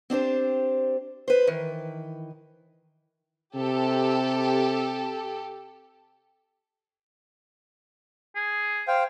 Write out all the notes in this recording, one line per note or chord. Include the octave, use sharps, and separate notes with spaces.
C4 D4 G4 C5
B4 C5
D#3 E3
C3 G4 A4
G#4
C5 F5 G5